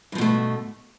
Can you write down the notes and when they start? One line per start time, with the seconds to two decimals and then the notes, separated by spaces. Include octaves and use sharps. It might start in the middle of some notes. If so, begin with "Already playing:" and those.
0.12 G2
0.15 F3
0.18 B2
0.21 A3
0.24 D3